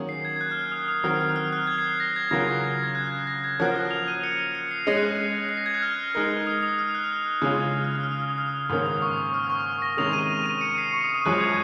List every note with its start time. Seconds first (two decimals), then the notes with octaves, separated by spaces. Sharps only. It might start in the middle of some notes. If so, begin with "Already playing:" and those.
Already playing: D#3 F#3 A#3 C#4 G#4
0.09 C7
0.25 G#6
0.36 G#6
0.41 F#6
0.51 F6
0.62 F6
0.72 D#6
0.88 D#6
1.04 D#3 F#3 C4 F#4 A#4 F6
1.20 F6
1.36 F6
1.53 F#6
1.67 G#6
1.78 C7
1.90 C7
2.00 A#6
2.16 G#6
2.31 C#3 F#3 C#4 F4 A#4 A#6
2.47 C7
2.84 G#6
2.95 F#6
3.07 F#6
3.11 G#6
3.27 A#6
3.44 G#6
3.59 F3 A#3 C#4 F#4 A#4 F#6
3.70 F6
3.75 F#6
3.91 F7
4.08 D#7
4.23 C#7
4.55 C#7
4.71 C7
4.87 G#3 C#4 G#4 D#5 A#6
4.97 F#6
5.09 F#6
5.49 C7
5.57 A#6
5.66 G#6
5.74 F#6
5.82 F6
6.15 G#3 D#4 A#4
6.47 D#6
6.63 D#6
6.79 F6
6.95 F#6
7.42 C#3 G#3 C#4 F4
7.84 F6
7.95 D#6
8.03 F6
8.12 D#6
8.22 F6
8.30 D#6
8.38 F6
8.47 D#6
8.69 G#2 D#3 A#3 C#4 D#6
8.86 D#6
9.02 C#6
9.18 D#6
9.34 F6
9.50 C#6
9.82 A#6
9.97 C3 D#3 G#3 C#4 G#4 F7
10.13 D#7
10.46 D#7
10.61 C#7
10.78 C7
10.93 C#6
11.04 D#6
11.15 D#6
11.25 F#2 F3 G#3 C#4 F#6
11.41 G#6